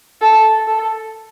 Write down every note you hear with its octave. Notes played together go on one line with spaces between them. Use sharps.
A4
A4